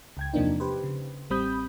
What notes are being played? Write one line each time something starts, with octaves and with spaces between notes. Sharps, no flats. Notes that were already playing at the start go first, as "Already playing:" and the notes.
C#2 G5 G#6
E2 C3 F3 A#3 D4 D#4
G4 B4 C5
C#3
A1 G3 C4 B5 D#6 G6